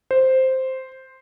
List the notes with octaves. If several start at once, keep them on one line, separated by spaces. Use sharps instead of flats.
C5